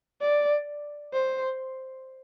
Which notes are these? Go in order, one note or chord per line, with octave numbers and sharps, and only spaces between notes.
D5
C5